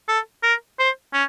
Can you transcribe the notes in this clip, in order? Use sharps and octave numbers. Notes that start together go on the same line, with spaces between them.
A4
A#4
C5
C#4